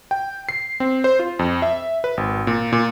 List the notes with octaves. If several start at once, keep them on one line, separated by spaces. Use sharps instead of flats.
G5
C7
C4
C5
F4
F2
E5
B4
G#1
A#2
A#2